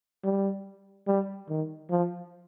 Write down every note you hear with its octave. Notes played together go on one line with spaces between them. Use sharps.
G3
G3
D#3
F3